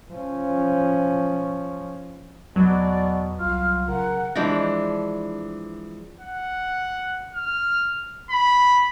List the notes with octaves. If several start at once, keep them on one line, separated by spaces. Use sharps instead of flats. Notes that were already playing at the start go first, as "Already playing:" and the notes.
F3 C#4
E2 B2 F#3 D5
C2 F4 F6
C#3 A#4 F#5
E3 F3 G#3 D4
F#5
F6
B5